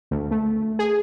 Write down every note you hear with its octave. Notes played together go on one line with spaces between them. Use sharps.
D2
A3
G#4